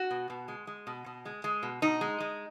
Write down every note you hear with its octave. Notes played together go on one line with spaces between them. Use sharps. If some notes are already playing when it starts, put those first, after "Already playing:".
Already playing: F#4
B2
B2
G#3
G#3
B2
B2
G#3
G#3
B2
B2 D#4
G#3
G#3